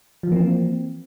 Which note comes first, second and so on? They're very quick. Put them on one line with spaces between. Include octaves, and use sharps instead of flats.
F3 E3 A#3 C4